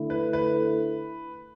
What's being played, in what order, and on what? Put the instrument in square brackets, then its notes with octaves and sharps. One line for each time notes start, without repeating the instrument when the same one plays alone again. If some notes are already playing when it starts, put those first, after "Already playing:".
Already playing: [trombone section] D3 A3 E4
[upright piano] B4
B4